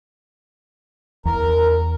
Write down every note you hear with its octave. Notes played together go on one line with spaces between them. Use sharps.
E2 A#4